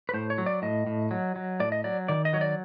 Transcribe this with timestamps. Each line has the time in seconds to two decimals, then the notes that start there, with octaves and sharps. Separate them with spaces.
0.09 B4
0.14 A2 C5
0.30 C#5
0.38 F#3
0.46 D5
0.62 A2 D#5
0.87 A2
1.11 F#3
1.36 F#3
1.60 A2 D5
1.72 D#5
1.84 F#3 D5
2.08 D#3 D5
2.25 D#5
2.33 F#3 C#5
2.41 D5